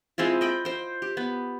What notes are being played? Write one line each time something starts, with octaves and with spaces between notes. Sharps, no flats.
G#3 C4 E4 F4
D#5 G5 B5
C5 G5
G4
B3